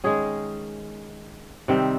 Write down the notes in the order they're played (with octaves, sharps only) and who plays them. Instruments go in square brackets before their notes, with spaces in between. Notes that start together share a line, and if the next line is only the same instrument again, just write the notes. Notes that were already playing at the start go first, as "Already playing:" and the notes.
[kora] D#3 G#3 C#4 G#4
C3 D#3 G3 C4